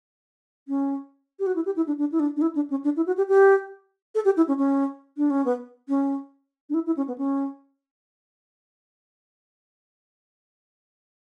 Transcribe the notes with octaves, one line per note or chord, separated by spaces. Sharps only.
C#4
G4
F#4
E4
G4
E4
D4
D4
E4
D4
D4
E4
D4
C#4
D4
E4
F#4
G4
G4
A4
G4
E4
C#4
C#4
D4
C#4
B3
C#4
D4
E4
E4
C#4
B3
C#4